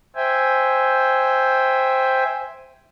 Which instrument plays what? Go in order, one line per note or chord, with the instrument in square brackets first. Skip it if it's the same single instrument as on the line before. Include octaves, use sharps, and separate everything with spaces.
[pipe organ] C5 E5 G5 G#5